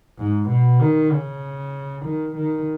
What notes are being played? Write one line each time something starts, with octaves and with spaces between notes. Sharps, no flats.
G#2
B2
D#3
C#3
D#3
D#3